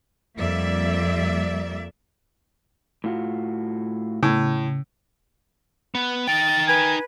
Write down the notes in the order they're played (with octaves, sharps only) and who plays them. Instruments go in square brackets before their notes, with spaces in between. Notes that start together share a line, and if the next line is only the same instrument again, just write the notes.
[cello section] F2 G3 A#3 D5 E5
[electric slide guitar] A2 F4 F#4
[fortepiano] A2 [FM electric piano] C#3
[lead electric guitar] B3
[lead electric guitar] D#4 G5 [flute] A6
[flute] B4 [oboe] G#5